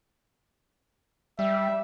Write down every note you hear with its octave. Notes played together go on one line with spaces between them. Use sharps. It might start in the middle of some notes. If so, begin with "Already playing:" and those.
G3 E5